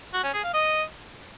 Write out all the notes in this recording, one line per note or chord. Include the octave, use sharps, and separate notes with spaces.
F#4
C#4
G#4
F5
D#5